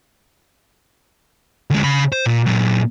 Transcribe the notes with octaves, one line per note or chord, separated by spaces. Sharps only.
D2 G#3
C#3 B5
C5
A#2
A#2 F#3